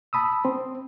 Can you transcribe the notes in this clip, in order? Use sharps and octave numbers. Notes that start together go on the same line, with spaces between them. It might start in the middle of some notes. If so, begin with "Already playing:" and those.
A5 B5 D#6 E6
C4